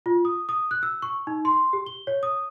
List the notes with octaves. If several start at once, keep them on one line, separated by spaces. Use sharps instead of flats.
F4
D#6
D#6
F#6
E6
C#6
D#4
C6
G4
G7
C#5
D#6